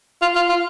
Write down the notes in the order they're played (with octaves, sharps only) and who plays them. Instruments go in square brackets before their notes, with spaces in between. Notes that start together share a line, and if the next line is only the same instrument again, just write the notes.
[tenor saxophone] F4
F4
F4